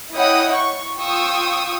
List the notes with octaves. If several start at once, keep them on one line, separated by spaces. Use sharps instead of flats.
E4 C#5 D#5 F#5 G5 D#6
C#6
F4 G5 C#6 D#6 E6